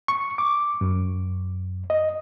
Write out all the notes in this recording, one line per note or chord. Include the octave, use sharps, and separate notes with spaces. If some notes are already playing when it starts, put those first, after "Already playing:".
C#6
D6
F#2
D#5